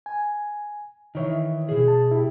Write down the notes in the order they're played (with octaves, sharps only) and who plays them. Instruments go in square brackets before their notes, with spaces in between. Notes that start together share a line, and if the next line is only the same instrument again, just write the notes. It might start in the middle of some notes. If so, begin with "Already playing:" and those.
[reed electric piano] G#5
[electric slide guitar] D#3 E3 [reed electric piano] D#4 C#5 E5
[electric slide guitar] B2 G#4
[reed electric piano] A5
E4 G4